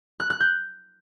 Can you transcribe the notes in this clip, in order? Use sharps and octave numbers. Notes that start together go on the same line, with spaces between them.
F#6
F#6
G6